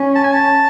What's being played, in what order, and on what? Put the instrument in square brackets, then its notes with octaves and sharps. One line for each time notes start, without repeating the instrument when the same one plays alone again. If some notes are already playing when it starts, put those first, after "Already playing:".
Already playing: [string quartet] C#4
[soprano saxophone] A5
G#5
A5